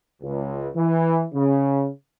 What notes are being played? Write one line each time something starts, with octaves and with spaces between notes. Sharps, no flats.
C#2
E3
C#3